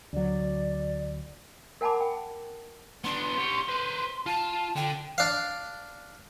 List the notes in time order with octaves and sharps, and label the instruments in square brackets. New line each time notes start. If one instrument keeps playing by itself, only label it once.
[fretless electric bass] D2 F#3 [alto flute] D5
[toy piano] A#4 F#5 G#5 A5 B5 D6
G5
[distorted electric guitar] B3 D4 [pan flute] C6
[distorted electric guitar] G3 C#5
B4 C5
[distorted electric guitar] F4 [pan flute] A5
[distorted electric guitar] D3 [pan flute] G5
[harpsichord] D4 F5